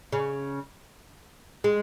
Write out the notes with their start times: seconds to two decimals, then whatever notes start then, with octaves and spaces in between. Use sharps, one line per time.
0.12 C#3
1.64 G#3